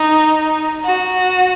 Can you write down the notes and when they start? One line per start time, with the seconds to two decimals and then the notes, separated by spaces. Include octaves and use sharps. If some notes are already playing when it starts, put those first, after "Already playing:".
Already playing: D#4
0.85 F#4